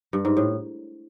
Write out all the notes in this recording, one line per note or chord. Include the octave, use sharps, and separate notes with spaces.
G2
G#2
A2